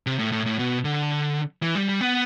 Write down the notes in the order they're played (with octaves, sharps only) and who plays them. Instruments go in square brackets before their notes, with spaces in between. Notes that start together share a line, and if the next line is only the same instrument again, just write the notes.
[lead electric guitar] C3
A2
A2
A2
B2
D3
E3
G3
G3
B3